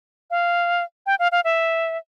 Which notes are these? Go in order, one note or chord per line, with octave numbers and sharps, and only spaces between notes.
F5
G5
F5
F5
E5